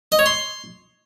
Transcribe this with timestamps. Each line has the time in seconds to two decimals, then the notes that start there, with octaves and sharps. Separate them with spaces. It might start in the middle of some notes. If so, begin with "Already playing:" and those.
0.12 D#5
0.19 C#5
0.26 C6